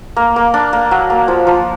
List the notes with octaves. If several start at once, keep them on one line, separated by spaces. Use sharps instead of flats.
A#3
A#3
D4
A#3
F#3
A#3
F3
F3